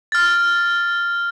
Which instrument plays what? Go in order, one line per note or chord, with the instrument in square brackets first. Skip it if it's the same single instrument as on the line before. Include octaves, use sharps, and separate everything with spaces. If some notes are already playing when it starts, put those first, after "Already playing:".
[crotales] F6 A6